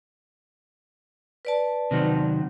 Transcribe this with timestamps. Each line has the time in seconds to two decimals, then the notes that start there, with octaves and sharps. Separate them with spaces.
1.45 B4 D5 A5
1.91 C3 D#3 F#3